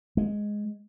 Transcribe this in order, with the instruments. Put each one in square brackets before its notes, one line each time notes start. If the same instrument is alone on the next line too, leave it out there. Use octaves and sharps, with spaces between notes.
[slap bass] G#3